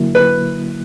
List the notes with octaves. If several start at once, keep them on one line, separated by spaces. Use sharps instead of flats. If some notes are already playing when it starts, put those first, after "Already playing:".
Already playing: D3 F#3 A#3 E4
B4